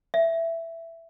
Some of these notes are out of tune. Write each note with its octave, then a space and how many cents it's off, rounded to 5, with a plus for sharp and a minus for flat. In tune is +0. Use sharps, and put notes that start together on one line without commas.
E5 +10